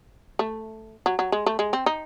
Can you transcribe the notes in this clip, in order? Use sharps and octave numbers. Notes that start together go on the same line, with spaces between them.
A3
F#3
F#3
G#3
A3
G#3
C4
D#4